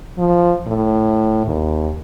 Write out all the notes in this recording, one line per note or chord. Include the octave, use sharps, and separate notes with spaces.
F3
A2
D#2